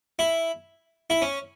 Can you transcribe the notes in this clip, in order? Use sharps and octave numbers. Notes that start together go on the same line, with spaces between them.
E4
E4
C#4